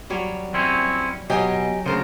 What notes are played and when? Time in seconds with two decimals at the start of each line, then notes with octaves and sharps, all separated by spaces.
0.10 F#3 G3 C#5
0.54 C4 C#4 E4
1.30 B2 F#3 G4 D#5 G#5
1.86 D2 C#3 F4 A#4 C5